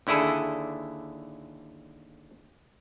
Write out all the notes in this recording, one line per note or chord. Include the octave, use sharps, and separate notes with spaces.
D#2 D3 E4 G#4 A4